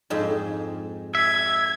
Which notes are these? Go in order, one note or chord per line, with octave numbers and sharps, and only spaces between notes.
F2 G#2 G#3
E5 G#6